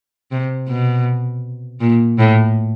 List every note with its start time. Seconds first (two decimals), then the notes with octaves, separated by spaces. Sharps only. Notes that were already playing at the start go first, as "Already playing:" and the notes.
0.32 C3
0.68 B2
1.81 A#2
2.18 A2